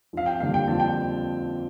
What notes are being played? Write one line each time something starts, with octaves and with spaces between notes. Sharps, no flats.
F2 F5
G5
D3 G3 A#3 F5
G5
F2 A5
G5